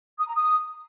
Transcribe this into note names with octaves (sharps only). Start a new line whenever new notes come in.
D#6
A#5
D#6